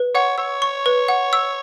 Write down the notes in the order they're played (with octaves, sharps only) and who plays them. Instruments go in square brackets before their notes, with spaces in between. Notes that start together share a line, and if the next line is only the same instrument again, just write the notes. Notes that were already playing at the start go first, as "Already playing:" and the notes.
Already playing: [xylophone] B4
[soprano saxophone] C#5 [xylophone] F#5
[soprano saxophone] C#5 [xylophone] E6
[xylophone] C#6
B4
F#5
E6